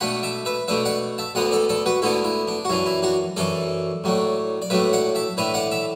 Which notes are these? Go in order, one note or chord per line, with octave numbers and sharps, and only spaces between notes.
B2 A3 D4 F#5 B5
E5 A5
B4 E5
B2 A3 D4 B4 E5
D5 F#5
E5 A5
D2 D3 B3 D4 D5 F#5
A4 D5
A4 D5
F#4 B4
D2 D3 B3 D4 E4 A4
E4
D4
F#4
F#2 E3 D4 E4
E4
D4 F#4
F#2 E3 D4 A4 D5
A2 F#3 A3 D4
D5
A2 F#3 A3 D4 B4 E5
D5 F#5
E5 A5
A2 E3 D4 B4 E5
D5 F#5
E5 A5